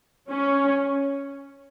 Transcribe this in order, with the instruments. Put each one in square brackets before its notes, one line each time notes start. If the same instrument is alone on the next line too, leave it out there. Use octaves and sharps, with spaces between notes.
[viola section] C#4